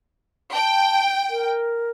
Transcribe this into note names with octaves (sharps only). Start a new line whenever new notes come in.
G5 A5
A#4